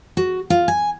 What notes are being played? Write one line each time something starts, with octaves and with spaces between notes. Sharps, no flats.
F#4
F4
G#5